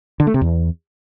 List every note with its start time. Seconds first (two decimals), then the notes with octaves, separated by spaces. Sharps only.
0.20 D3
0.27 A3
0.34 C3
0.41 E2